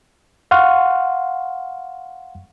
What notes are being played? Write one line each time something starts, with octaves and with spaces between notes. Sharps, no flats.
F5 F#5 C6 C#6 F6